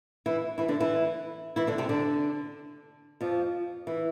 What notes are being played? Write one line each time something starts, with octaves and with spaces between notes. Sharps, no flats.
E3 E4
E3 E4
D3 D4
E3 E4
E3 E4
D3 D4
C3 C4
D3 D4
F2 F3
E3